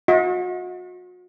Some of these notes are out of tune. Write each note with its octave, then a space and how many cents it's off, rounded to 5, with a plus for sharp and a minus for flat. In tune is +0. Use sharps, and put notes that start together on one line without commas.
F#4 -40 D#5 +40